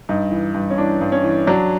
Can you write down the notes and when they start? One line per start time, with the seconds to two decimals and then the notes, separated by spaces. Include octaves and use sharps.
0.09 G2 D#4
0.31 E3
0.54 G2
0.70 C#4
0.78 E3 D4
1.01 G2
1.12 C#4
1.24 E3
1.47 F#3 D4